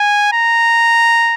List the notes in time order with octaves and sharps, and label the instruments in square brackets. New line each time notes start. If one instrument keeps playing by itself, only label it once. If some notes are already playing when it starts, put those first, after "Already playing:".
Already playing: [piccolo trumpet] G#5
A#5